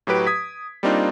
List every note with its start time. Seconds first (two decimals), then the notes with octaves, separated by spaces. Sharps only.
0.07 A2 F#3 G4 B4 D7
0.27 D#6 G#6 B6
0.83 G3 A#3 C4 D4 D#4 F4